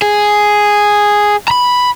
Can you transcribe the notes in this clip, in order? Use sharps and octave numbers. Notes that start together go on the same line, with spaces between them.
G#4
A#5 B5